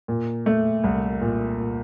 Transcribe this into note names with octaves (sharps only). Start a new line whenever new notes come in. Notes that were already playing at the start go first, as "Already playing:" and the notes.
A#2
A3
C2
A#2
A#2